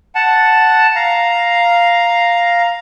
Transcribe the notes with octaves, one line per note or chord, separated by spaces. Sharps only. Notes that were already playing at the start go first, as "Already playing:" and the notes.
F#5 A5
F5 A#5